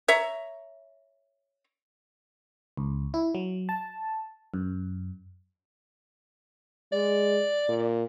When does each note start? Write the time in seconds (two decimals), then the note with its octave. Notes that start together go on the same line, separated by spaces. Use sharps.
0.08 C#5 E5 A#5
2.77 C#2
3.14 E4
3.35 F#3
3.69 A5
4.54 F#2
6.92 G#3 D5
7.68 A#2